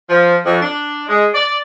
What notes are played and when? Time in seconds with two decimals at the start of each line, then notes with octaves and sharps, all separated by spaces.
0.09 F3
0.46 F2
0.62 D4
1.09 G#3
1.34 D5